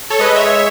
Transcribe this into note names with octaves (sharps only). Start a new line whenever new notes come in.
A4 C#5
G#3 B4 D#5
C#5 E5